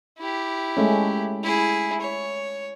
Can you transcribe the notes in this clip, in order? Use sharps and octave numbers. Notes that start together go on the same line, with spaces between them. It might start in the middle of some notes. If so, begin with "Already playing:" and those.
E4 G4
G#3 A3 C#4
E4 G#4
C#5